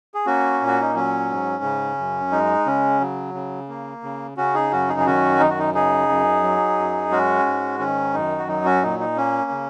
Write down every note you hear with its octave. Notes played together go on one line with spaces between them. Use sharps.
G#4
A#3 C#4 F#4
A#2
F#4
D#4
F#3 C#4
G#2
C#3
F#2
G#3 D#4
C#3 C#4
F#3
C#3
A#3
C#3
C#3 C#4 F#4
D#4 G#4
F#2 C#4 F#4
D#4 G#4
G#4
D#3 C#4 F#4
F#2 D#4
F#4
D#4
C#3 D#4 G#4
F#2
F#3
F#2
G#3 C#4 F#4
G#2
D#3 C#4
F#2 D#4
F#4
F#3 D#4
C#4 F#4
A#2 D#4
D#4
A#3 C#4
C#3